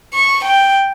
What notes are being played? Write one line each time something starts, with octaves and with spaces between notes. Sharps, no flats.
C#6
G5